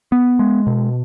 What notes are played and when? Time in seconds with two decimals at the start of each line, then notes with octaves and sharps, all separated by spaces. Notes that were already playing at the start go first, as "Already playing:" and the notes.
0.12 B3
0.39 G#3
0.67 B2